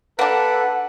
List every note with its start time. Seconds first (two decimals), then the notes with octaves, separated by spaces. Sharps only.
0.19 A#3 D4 A4 B4 F#5